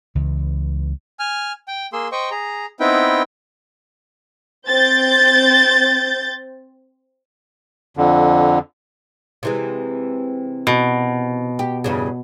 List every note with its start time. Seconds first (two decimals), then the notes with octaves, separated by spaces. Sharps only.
0.15 C#2 E3
1.19 G#5 F6
1.68 G5
1.93 A#3 G#4 C6 E6
2.12 C5 D#5 G5 C#6
2.31 G#4 A#5
2.80 B3 C4 D#4 E4 B4 G5
4.68 C4 G6 A6
7.97 F2 D3
9.43 C3 E3 G#3
10.67 B2
11.59 G4
11.84 E2 G2 C#3